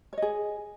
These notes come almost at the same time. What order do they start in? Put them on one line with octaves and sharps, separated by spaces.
C#5 D#5 G#4